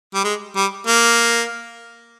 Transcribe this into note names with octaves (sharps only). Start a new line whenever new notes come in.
G3
G#3
G3
A#3